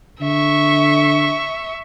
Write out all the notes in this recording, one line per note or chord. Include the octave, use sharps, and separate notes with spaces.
D3 E5 C#6